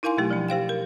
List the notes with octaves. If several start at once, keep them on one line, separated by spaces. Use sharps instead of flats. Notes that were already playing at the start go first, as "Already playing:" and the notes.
D#4 E4 A#4 F5 G#5 C6
B2 F#3 A3 G4
F3 G3 D4
G4 C5 F5 G5
A#4